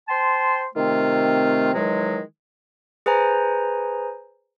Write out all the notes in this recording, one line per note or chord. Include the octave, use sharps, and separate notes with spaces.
C5 G5 A5 C6
C3 D#3 A3 C4 F4
D#3 E3 F#3 G#3
G#4 B4 C5 G#5 A#5